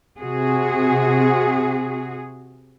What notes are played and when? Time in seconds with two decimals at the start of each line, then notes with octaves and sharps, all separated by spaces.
0.19 C3 F#4 G#4